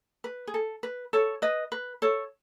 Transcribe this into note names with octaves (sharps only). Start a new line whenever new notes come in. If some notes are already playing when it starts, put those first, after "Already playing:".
B4
G#4
A4
B4
A4 C#5
B4 D#5
B4
A4 C#5